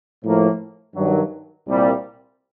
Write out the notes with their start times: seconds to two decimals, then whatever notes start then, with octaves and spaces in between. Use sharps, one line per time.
0.24 A2 F3 A#3
0.95 G2 D#3 F#3
1.67 C2 A#2 G3